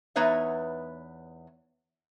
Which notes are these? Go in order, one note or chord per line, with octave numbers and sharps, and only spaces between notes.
E2 B3 D#4 B4 C#5 E5